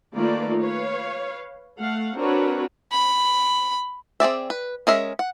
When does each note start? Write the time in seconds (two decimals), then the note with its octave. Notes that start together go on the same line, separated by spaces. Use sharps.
0.14 D#3 A3 A#3 F4 B4 D5
0.59 B4 C#5 F5
1.78 A3 F5 F#5
2.15 C4 D4 F#4 A#4 B4 C#5
2.92 B5
4.20 C4 G#4 D5 E5
4.50 B4
4.87 G#3 C#4 G#4 A#4 E5
5.19 F#5